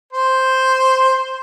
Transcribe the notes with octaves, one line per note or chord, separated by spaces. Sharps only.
C5